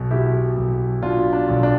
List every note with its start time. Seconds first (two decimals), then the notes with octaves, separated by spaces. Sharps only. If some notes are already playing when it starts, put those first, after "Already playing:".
Already playing: B1 B2
0.11 B2 E4 G4
0.57 B1
1.02 B2 D4 F4
1.33 D4
1.48 B1
1.63 D4